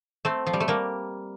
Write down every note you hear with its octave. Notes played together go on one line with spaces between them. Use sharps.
A3 C4
F3
G3
A3
G3 A#3